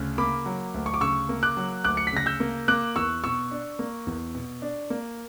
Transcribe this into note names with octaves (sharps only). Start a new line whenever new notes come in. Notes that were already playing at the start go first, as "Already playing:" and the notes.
Already playing: D2 C#3
A#3 B5 D6
F#3
D2
C#6
D6
C#3 C#6 E6
A#3
D6 F#6
F#3
D2 D6 F#6
C#7
B6
C#3 A#6
E6 G6
A#3
A#3 D6 F#6
E2 C#6 E6
B2 C#6 E6
D4
A#3
E2
B2
D4
A#3